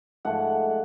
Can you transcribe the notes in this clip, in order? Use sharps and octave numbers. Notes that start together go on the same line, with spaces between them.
G#2 F3 A3 F#5